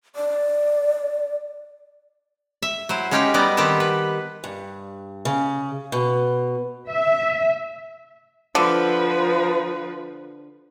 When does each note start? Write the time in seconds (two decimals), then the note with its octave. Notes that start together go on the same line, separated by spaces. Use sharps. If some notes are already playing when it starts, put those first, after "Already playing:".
0.16 D5
2.62 E5
2.89 F#3 E4 C5
3.11 G#3 C#4 D#4 G4 F5 G5
3.34 F#3 G3 B3 D#4 D5 D#5
3.57 D#3 B3 C4 G4 A5
3.80 B4
4.44 G2
5.25 C#3
5.92 B2
6.87 E5
8.55 D3 F3 B4